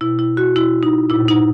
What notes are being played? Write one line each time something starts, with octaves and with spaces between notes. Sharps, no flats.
B2 E4
E4
F#4
B2 E4
D#4
A#2 E4
D#4